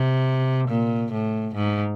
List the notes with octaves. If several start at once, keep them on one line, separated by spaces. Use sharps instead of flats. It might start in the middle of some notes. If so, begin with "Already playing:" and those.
Already playing: C3
A#2
A2
G#2